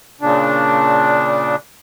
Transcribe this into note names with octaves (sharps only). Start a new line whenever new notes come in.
A#2 C#3 D4